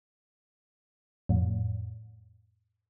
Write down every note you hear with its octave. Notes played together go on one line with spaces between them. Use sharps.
F2 A2